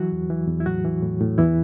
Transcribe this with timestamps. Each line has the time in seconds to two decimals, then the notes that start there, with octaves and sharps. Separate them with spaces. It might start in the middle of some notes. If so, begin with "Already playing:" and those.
Already playing: E3 F#3 F#4
0.12 E2
0.30 E3
0.48 E2
0.60 E4
0.66 A2 F#3 F#4
0.84 E3
1.03 A2
1.20 A2
1.38 E2 E3 E4